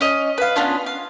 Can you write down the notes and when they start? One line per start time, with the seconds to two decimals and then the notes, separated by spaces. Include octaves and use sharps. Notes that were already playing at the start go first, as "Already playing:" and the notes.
0.01 C#4 D#5
0.38 B4 F5
0.56 B3 C#4 D4 F4
0.86 F5